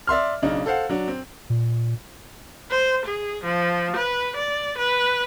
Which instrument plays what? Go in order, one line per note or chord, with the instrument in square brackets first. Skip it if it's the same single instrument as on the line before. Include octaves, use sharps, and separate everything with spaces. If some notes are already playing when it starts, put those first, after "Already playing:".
[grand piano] D5 E5 C6 F6
B1 C#3 D4 D#4
A4 C5 F5 F#5
F#3 D4
C4
[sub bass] A#2
[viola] C5
G#4
F3
B4
D5
B4